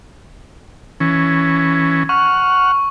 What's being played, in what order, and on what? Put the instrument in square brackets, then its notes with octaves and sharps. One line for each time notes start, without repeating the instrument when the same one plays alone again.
[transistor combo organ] E3 C#4
[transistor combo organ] F#5 F6 [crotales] C#6